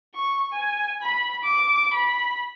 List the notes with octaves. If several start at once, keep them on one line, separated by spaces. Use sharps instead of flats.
C#6
G#5
B5
D6
B5